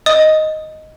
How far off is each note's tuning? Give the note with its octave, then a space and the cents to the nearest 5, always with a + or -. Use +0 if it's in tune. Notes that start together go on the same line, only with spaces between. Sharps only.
D#5 +0 D#6 +0